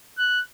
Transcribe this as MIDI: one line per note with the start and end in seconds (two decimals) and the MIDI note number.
0.18 0.40 90